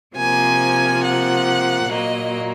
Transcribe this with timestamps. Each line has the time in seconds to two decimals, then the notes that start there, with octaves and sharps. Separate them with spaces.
0.16 C3 F3 A#3 G#5
1.04 F#5
1.91 A#2 F#3 A#3 D#5